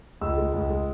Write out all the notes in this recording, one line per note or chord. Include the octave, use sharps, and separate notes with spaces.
C#2 E6
G#3
C#2
G#3